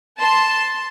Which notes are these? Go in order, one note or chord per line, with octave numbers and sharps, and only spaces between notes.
A5 C6